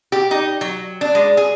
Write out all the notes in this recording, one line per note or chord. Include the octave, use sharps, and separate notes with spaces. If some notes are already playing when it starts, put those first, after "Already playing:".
G4
D#4
F#3
D4
G#3
G#4